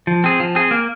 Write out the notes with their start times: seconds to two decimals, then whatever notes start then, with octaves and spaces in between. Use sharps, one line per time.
0.07 F3
0.24 C4 G#4
0.40 F3
0.55 C4 G#4
0.71 A#3